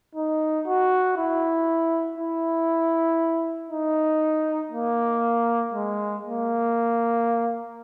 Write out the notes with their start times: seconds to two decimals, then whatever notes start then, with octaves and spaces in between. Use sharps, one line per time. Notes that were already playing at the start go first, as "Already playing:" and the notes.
0.15 D#4
0.67 F#4
1.17 E4
2.18 E4
3.70 D#4
4.72 A#3
5.74 G#3
6.25 A#3